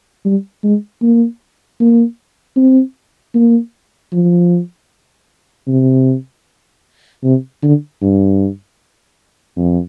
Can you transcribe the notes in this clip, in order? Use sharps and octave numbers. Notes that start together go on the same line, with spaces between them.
G3
G#3
A#3
A#3
C4
A#3
F3
C3
C3
D3
G2
F2